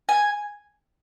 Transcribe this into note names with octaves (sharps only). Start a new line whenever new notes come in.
G#5